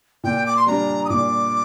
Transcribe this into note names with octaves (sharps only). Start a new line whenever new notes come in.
A#2 G5
D6
C6
G3 D4 A#5
D#6
A#2 D6